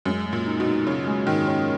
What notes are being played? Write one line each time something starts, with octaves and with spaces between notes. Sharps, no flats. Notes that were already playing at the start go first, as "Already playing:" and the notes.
F#2 G#3
G#3
A#2
D#4
B2
D#4
C#3 C#4
G#3
G#2 D#3
C#4